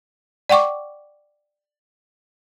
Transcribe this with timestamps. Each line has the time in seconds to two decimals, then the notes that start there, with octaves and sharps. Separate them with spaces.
0.49 D5 F#5 G5 C#6 D6